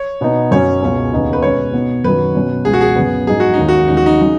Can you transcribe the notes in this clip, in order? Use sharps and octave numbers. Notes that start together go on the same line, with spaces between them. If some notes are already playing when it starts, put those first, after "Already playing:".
Already playing: C#5
B2 B3 D#4
F#2 F#3 C#4 C#5
C#2 B2 G#3 C#4
D#2 C#3 B3 D#4
B4
B2 G#3 C#4 C#5
B2 B3 D#4
F#2 D#3 F#3 B4
B2 F#3 C#4
C#2 B2 G#3 G#4
F#4
G#4
F#2 C#3 B3
G#2 F#3 D#4 G#4
F#4
D#2 D#3 G#3 C#4 D#4
F#4
D#2 C#3 G#3 D#4
F#4
D#4
C#3 F#3